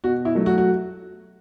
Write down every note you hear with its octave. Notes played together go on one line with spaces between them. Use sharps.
B2 F#4
E4
F#3 A3
F#4
F#4